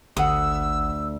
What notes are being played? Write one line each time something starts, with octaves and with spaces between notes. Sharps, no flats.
G#1 D2 F#5 D#6 E6